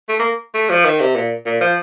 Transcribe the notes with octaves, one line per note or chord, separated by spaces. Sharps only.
A3
A#3
A3
F3
D#3
C3
A#2
A#2
F3